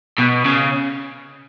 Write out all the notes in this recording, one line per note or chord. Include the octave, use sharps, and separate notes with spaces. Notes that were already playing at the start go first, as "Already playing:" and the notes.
B2
C#3